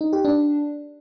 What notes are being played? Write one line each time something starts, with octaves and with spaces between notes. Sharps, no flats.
D#4
G4
D4